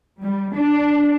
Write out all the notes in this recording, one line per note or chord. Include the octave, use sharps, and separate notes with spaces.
G3
D4